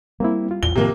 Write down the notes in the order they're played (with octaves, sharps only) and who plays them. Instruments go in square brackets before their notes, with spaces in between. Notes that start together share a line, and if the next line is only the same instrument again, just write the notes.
[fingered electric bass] G3 [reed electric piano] A#3 C4 E4
[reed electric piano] F4
[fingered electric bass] A1 E2 [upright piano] G7
[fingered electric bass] A2 D#3 F3 [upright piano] C3 A#3